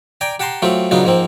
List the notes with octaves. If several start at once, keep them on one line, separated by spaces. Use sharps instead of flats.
D5 G5 G#5 A#5
G4 F#5 A5 A#5 C6
F#3 A3 C4 F4 G4
C#3 F#3 B3 D4 D#4 F4
G#2 F3 A#3 C4